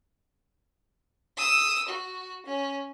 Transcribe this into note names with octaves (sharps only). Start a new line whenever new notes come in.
D#6 E6
F#4
C#4